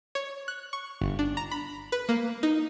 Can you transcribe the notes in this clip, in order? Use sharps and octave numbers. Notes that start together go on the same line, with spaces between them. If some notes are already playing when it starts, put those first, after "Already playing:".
C#5
F#6
C#6
G1
D4
A#5
B5
B4
A#3
D#4